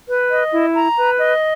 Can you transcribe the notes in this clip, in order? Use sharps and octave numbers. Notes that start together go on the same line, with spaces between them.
B4
D#5
E4
A#5
B4
D#5